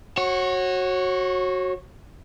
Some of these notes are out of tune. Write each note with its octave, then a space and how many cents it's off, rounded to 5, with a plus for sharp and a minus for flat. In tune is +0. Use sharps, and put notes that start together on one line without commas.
F#4 +0 C#5 -30